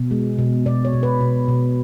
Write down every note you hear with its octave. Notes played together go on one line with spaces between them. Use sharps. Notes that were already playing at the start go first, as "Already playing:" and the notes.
Already playing: B2
G#3
B2
B2 D5
C#5
B2
B4
B2
B2